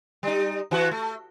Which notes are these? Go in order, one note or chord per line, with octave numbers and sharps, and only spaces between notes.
G3 D#4
E3 F#4
A3